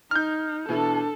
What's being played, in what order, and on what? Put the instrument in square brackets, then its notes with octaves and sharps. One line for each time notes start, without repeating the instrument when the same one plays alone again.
[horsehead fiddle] D#4 [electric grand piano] F6 G6
[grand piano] B2 E3 E4 [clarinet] D4 [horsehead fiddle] A4